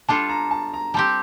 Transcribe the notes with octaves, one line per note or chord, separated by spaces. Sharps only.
G3 D4 F4 A4 A5
A#5
A5
A#5
G3 C4 G4 A5